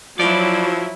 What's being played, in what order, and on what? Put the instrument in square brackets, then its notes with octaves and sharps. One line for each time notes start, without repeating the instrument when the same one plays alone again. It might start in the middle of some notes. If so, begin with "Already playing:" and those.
[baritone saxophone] F3 [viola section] F#3 E4 [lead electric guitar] D5